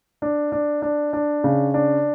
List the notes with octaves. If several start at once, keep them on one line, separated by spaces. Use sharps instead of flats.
D4
D4
D4
D4
C#3
D4